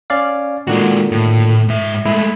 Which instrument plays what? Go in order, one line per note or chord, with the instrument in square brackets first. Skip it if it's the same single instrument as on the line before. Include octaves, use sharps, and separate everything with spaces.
[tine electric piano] C#4 D5 F5
[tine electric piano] A#2 D3 D#3 [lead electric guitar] G#3 F#4
[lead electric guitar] A2
G#2 E5
[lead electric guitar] G#3 A3 [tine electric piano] E4